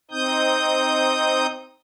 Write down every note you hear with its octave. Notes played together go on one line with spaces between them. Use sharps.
C4 D#4 D#6 G6